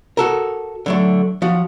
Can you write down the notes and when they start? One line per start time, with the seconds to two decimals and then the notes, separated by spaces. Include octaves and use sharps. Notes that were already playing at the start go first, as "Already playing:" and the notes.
0.17 F#4 A4 A#4
0.86 D3 F#3 A3
1.42 F3 F#4